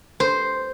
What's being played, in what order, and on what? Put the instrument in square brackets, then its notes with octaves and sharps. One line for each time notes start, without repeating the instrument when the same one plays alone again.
[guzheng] C5